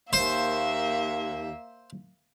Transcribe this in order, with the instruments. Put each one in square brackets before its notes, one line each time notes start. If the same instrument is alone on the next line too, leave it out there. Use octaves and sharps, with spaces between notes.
[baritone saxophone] D#2 [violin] A#3 E5 [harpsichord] C5